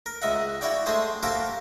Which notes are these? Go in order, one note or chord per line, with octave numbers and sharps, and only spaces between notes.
A#4
C#2 D#5 E5 F#5
E4 F#4 C#5 D5 G5
G#3 A3 C4 G#4 C5
A#3 C4 F#4 G4 A4 D6